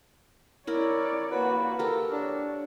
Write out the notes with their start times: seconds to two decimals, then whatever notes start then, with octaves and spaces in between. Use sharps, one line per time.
0.67 E4 A#4 C#5 D5
1.31 A#3 F#4 B4
1.79 A#3 G4 A4 A#4
2.12 D4 C#5